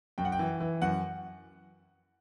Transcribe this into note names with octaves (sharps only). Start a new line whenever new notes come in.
F#2 G5
F#5
G5
E3
E3
F#2 F#5